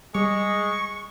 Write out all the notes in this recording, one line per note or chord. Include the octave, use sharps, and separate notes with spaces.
G3 G#3 C#6